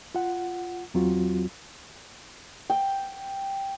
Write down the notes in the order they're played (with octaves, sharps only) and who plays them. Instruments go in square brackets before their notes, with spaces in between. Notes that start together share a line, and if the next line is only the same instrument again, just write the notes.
[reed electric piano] F4 F#5
E2 F#3 C4 F4 F#4
[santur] G5